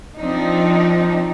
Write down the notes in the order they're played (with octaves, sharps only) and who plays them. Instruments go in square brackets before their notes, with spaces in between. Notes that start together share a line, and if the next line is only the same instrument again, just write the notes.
[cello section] F3 C4 D4 D#4